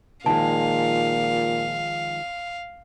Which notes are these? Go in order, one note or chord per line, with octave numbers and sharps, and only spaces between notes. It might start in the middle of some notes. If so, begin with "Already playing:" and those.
A#2 D#3 F3 G#3 F5 A5